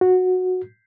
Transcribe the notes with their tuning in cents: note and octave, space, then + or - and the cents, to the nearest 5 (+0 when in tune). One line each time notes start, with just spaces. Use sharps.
F#4 -10